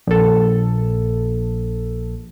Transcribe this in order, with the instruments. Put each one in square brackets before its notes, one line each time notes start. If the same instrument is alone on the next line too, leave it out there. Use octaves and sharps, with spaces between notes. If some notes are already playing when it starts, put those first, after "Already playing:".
[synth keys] A#1 A4